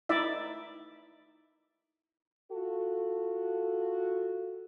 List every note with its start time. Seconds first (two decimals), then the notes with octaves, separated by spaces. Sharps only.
0.09 D#4 E4 D5 E5
2.52 F4 F#4 A4